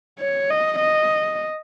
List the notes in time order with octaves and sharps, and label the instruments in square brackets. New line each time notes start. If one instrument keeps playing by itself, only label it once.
[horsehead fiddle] C#5
D#5
D#5